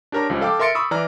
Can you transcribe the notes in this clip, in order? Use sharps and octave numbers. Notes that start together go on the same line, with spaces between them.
D4 G4 A#4 C#5 A#5
C#2 F3 G3 C#4
A4 F5 G5 D6
A#4 E5 C6 A6 C#7 D7
B5 C#6 D#6 E6
E3 D5 A#5 F6